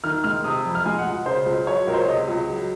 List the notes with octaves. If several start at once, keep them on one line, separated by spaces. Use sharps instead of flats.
D#3 F6
G#3 F6
C3 D#6
F2
F6
G#3 G#5
F#5
C#2
C#3 C5
C#2
F#3 C#5
C#2 A#4
C5
C#5
C3 D#5
C#2
F#3